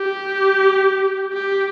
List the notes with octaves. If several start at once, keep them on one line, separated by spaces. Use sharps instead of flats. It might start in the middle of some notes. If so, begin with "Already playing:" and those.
Already playing: G4
G4